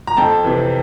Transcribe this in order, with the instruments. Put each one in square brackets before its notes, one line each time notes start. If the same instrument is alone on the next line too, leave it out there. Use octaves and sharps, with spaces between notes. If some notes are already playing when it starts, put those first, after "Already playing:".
[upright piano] A#5
F2 G5 A5
C3 E3